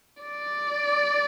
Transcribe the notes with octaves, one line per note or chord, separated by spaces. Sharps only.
D5